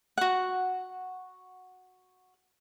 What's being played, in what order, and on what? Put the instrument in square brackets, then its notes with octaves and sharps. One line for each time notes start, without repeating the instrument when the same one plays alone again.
[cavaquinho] F#4 F#5